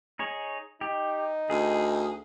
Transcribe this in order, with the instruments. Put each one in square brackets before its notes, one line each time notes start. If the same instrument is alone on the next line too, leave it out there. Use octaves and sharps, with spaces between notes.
[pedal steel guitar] D#4 G#4 C#5
[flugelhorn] D#4 [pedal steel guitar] G4
[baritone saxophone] D2 [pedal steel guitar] G#4